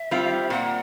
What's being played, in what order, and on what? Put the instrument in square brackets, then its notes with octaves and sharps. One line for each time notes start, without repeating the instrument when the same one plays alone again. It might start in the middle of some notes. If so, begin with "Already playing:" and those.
Already playing: [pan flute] E5
[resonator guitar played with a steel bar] G3 C4 F4
[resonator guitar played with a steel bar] A#2 [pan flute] F#5